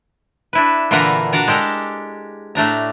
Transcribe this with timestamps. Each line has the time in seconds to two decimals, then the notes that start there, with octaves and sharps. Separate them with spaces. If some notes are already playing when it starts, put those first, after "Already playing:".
0.53 D4 E4 B4
0.91 A#2 D3 E3 A#4 B4 F#5
1.33 D4 F#4 D5 A#5
1.48 G#3 G4 A4 A#4
2.55 A2 A3 D4 A#5